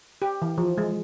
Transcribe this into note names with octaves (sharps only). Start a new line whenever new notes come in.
G4
E3
F3
G#3